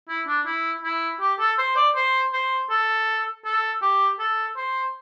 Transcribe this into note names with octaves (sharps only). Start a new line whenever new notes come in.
E4
D4
E4
E4
G4
A4
C5
D5
C5
C5
A4
A4
G4
A4
C5